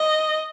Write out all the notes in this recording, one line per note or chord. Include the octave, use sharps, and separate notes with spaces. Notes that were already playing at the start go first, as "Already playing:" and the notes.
Already playing: D#5